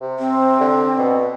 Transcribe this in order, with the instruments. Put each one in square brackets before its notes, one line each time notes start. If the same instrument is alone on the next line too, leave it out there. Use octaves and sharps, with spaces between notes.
[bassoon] C3
[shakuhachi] C4
[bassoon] D3
B2